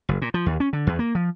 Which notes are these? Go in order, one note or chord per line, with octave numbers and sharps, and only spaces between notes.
F#1
A#2
F3
D#2
C#4
D3
E2
A#3
F3